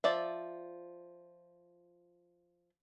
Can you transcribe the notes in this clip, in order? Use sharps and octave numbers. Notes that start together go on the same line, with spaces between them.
F3 D5 E5